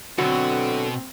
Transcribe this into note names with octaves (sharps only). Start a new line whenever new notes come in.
B2 D3 F#3 C4 F#4